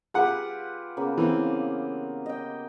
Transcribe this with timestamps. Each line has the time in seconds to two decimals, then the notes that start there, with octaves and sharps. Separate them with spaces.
0.14 F4 G4 G#4 B4 F#5
0.97 C#3 A#3 B3
1.18 E3 C4
2.26 D#5 G5